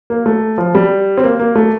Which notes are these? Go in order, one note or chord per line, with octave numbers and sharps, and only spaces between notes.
A#3
A3
F3
G3
C4
A#3
A#3
A3